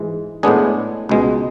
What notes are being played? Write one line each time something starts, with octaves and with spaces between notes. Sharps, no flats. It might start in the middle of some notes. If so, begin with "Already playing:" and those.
Already playing: G#2 E3 G#3
A2 G#3 B3 D4 G#4
C#2 B2 G#3